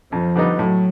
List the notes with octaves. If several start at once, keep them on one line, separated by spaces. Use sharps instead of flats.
F2 F3
D3 G3 B3 D#4
A2 F#3